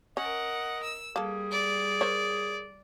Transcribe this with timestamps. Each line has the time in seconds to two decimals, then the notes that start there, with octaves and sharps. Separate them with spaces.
0.17 C#4 A#4 D#5 F#5
0.83 E6
1.16 G3 A#3 G#4 A4
1.51 D5
2.01 A#4 C5 C#5